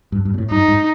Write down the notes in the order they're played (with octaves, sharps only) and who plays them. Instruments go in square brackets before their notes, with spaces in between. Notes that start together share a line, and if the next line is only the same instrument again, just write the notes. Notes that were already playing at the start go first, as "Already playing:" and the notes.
[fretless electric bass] G2
G2
A#2
A2
[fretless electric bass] G2 [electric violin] D#4
[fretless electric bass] G#2